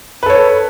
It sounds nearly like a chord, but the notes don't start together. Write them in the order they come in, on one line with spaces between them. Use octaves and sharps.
B4 A4 C#5